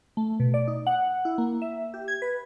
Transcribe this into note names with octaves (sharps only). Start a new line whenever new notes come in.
A3
B2
D5
D#4
F#5
E4
A#3
E5
G4
G#6
B4